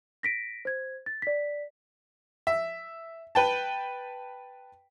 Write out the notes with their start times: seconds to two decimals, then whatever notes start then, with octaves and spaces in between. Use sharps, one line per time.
0.23 A#6 B6 D7
0.65 C5 G#6
1.06 A6
1.22 D5 B6
2.47 E5
3.35 B4 G5 A5